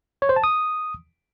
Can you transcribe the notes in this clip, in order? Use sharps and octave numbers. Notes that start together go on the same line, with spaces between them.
C#5
C5
A5
D#6